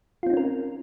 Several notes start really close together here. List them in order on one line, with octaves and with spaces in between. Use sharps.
F4 C4 D#4 C#4 A#4